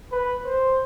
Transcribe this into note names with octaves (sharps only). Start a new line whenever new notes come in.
B4
C5